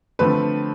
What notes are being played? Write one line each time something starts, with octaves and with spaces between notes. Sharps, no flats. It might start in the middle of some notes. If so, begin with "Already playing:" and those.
D3 F3 A3 C4 B4